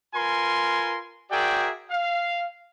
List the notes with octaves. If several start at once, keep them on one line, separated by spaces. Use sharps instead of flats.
F4 A#4 B4 G#5 C6
F#4 G#4 A#4 D5 E5 G5
F5